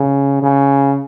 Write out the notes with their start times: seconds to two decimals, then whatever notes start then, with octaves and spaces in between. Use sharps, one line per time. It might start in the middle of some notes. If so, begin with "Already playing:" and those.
Already playing: C#3
0.43 C#3